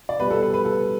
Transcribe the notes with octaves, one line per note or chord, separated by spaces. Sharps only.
D5
B2 G3 B4
A4
B4
B4
A4